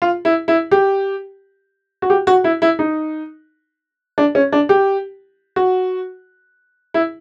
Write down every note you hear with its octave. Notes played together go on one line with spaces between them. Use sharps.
F4
E4
E4
G4
F#4
G4
F#4
E4
E4
D#4
D4
C#4
D4
G4
F#4
E4